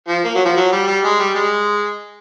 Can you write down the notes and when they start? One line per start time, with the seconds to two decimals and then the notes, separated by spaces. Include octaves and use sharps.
0.08 F3
0.24 A#3
0.35 F#3
0.45 F3
0.56 F#3
0.72 G3
0.87 G3
1.04 G#3
1.19 G3
1.35 G#3